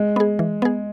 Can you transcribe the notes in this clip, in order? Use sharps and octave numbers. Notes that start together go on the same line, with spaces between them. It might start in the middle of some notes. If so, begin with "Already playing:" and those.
Already playing: G#3
B3 G#4
E3
B3 G#4